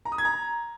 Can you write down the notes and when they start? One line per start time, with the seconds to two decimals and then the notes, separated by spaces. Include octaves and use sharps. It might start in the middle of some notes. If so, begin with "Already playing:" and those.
0.05 A#5
0.12 D#6
0.18 G#6
0.25 A#5